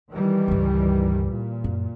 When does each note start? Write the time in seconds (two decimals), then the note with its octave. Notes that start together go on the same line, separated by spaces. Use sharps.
0.10 D#3 E3 G3
0.48 C#2 G2
1.25 A#2
1.64 F#2